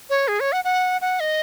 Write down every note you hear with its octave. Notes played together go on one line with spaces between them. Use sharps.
C#5
G#4
C#5
F#5
F#5
F#5
D#5